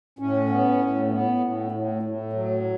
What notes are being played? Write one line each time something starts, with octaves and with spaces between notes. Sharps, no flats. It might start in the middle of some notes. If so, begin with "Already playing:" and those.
A2 C#4
B3
A2
B3
A2
A2
A2
F#3